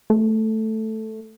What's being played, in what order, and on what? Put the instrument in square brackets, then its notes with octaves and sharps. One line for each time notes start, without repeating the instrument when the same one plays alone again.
[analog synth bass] A3